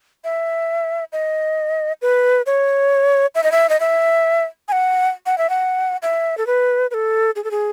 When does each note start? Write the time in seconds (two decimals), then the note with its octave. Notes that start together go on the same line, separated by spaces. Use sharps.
0.24 E5
1.13 D#5
2.02 B4
2.46 C#5
3.35 E5
3.44 D#5
3.52 E5
3.69 D#5
3.80 E5
4.68 G#5
4.72 F#5
5.26 F#5
5.38 E5
5.50 F#5
6.02 E5
6.38 A4
6.47 B4
6.91 B4
6.94 A4
7.36 G#4
7.44 A4
7.51 G#4